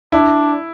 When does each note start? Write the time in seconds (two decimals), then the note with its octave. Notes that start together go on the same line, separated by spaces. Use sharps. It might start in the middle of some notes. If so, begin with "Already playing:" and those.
0.12 D4 E4